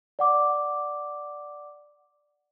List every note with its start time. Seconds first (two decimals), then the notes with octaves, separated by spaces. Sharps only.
0.19 D5 F#5 D6